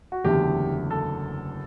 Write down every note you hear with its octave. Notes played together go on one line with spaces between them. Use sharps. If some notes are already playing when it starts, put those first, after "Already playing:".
F#4
F#1 E2 D3 A3 G4
A4